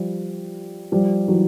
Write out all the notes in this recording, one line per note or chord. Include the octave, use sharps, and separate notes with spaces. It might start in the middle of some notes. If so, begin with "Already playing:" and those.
Already playing: F3 G3
F3 G3
E3 F#3